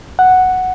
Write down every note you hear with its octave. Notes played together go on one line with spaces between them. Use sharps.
F#5